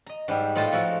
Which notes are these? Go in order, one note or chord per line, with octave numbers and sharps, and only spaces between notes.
D#5 A#5
G#2 G3
A2 D#4 F4 D#5 A5
F3 F#4 A4 A#4